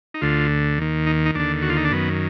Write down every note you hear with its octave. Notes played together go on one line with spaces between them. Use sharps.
D#4
D2 D3 F4
D#2 D#3
D#4
D#4
D#2 D3 D4
F#4
F4
D#4
D4
F#2 D#3 B3